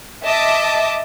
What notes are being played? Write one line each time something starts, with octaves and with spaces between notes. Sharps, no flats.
D#5 E5 A5 D6